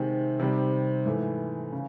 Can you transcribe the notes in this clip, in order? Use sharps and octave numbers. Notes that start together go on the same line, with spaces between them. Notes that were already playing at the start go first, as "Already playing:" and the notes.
Already playing: C3 D#3 G#3 C4
C3 D#3 G3 C4
G#2 E3 A3
C#3